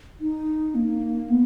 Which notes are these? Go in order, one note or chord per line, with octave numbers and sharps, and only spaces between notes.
D#4
A#3
B3